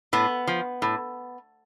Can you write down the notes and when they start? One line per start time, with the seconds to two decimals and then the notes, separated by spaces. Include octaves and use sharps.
0.13 A2 B3
0.47 F3
0.82 A2